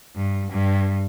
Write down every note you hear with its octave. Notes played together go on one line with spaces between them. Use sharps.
G2
G2